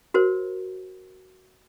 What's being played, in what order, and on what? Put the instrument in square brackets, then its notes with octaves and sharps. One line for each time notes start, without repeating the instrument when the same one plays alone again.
[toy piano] F#4 A#4 C5